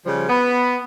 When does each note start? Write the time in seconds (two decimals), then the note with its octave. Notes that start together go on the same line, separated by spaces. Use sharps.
0.06 C#3 F3 G3
0.28 B3